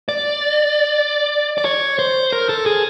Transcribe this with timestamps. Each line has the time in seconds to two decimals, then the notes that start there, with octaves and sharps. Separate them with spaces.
0.09 D5
1.58 D5
1.65 C#5
1.99 C5
2.33 A#4
2.49 A4
2.66 G#4